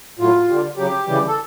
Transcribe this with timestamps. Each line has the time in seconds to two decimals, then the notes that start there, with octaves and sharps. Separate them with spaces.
0.19 A2 F#3 F4
0.48 D3 G3
0.77 C#3 F#3 G4
1.07 C#3 E3 G3
1.28 A4